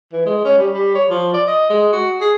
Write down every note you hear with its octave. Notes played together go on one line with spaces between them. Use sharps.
E3
G#3
C#4
G3
G3
C#5
F3
D5
D#5
G#3
F#4
G#4